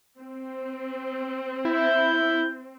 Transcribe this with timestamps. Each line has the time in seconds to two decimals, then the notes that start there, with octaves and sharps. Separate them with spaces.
0.18 C4
1.65 E4 G6